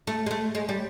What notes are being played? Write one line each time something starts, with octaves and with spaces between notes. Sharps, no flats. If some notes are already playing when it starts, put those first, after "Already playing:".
A3
G#3
A3
G#3
G3